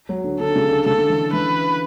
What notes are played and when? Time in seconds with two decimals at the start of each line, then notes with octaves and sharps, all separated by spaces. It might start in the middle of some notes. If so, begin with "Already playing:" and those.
0.09 F#3
0.24 D3
0.40 D3 A4
0.55 C#3
0.71 D3
0.86 C#3 A4
0.98 D3
1.10 E3
1.33 E3 B4